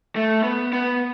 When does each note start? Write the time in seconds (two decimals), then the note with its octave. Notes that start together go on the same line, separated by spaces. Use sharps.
0.16 A3
0.43 B3
0.73 B3